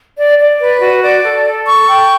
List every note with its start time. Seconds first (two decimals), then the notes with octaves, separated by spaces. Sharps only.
0.17 D5
0.39 D5
0.60 B4
0.81 F#4
1.02 D5
1.24 A4
1.45 A4
1.66 C#6
1.88 G5